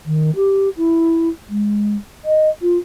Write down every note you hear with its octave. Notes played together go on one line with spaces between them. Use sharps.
D#3
G4
E4
G#3
D#5
F4